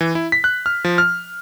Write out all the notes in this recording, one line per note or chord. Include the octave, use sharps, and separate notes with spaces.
E3
E4
B6
F#6
F6
F3
F6